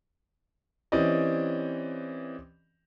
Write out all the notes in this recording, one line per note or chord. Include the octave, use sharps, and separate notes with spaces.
E3 C4 C#4 G4 D5 D#5